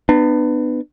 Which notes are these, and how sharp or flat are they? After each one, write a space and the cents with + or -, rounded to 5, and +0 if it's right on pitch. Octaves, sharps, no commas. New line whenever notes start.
B3 +10 D4 +40